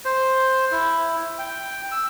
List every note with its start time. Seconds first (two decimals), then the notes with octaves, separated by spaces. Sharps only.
0.05 C5
0.72 E4
1.39 G5
1.92 E6